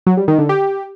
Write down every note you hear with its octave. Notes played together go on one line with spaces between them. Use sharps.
F#3
G3
D#3
D3
G4